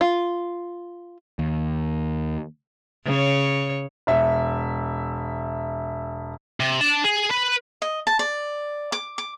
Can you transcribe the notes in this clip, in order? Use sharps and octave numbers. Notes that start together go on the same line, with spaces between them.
F4
D#2
C#3 C#5
E1 E5
C3
D4 A5
G#4
B4
D#5
A5
D5
D6
D6